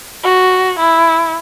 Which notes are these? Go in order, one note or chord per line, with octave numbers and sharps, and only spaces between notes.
F#4
E4